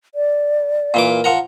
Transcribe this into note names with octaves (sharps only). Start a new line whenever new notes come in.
D5
A#2 E3 D6
A#4
F3 F#5 A#5